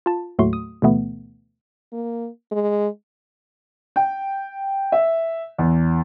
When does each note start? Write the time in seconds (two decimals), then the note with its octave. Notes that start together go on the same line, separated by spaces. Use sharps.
0.06 F4 A5
0.39 D#2 A2 F#3 A3 F#4 C6
0.53 D#6
0.82 D2 B2 E3 A3 B3
1.93 A#3
2.52 G#3
3.96 G5
4.92 E5
5.58 E2